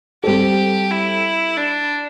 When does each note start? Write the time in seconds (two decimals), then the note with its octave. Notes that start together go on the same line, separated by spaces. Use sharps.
0.24 G3 C4 G4 A4
0.90 E4
1.57 D4